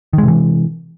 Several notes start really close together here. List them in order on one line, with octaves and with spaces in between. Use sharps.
D#3 G#3 C3 E3